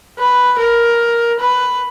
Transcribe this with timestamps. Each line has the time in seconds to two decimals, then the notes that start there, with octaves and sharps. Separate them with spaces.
0.19 B4
0.59 A#4
1.40 B4